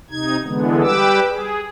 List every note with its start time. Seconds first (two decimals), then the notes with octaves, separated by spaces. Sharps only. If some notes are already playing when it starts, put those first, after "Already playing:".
0.11 C3 D#4 G#6
0.45 D3 E3 G#3 B3
0.83 G3 G4 B4 D6 E6
1.29 G#4